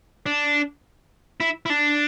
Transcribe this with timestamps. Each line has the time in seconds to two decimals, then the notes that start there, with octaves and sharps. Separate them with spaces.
0.26 D4
1.40 E4
1.66 E4
1.70 D4